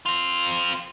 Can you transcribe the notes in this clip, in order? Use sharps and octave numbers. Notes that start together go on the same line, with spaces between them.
C4 F4